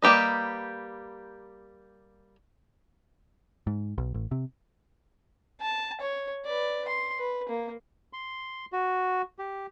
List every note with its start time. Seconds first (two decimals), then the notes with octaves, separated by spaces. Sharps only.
0.02 G3 A#3 G4 B4 D#5
3.67 G#2
3.98 B1
4.14 A1
4.31 C3
5.61 A5
6.01 C#5
6.46 B4 D5
6.88 C6
7.18 B4
7.49 A#3
8.13 C6
8.73 F#4
9.39 G4